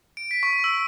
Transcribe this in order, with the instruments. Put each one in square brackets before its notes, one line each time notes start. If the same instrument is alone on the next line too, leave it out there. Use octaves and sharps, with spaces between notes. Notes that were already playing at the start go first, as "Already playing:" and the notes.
[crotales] D7
B6
C#6
E6